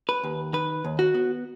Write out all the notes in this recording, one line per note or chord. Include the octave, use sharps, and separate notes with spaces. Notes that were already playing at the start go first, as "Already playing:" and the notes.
B4
D#2
D#3 B4
D#2
F#4
B3